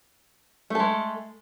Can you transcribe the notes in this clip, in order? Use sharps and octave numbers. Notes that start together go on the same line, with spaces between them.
G#3 A3 A4